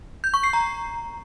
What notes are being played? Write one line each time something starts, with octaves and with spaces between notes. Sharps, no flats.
G6
C#6
C7
A#5